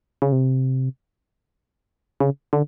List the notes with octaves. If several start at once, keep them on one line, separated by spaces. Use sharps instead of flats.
C#3
C3
C#3
D3